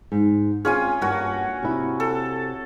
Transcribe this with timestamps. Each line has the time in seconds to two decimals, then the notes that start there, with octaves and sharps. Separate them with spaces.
0.12 G#2
0.65 C4 C#4 F4 G#4 G#5
1.01 G2 A#3 C#4 F#4
1.63 C3 E4
2.00 A4